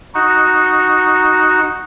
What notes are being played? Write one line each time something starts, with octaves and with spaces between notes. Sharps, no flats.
D#4 F#4